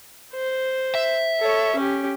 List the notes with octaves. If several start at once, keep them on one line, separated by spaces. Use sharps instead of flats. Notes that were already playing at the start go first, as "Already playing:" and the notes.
C5
E5
A4 C#5
C#4 G4